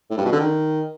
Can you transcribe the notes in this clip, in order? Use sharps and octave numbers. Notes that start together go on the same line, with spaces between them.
A2
G2
B2
D3
D#3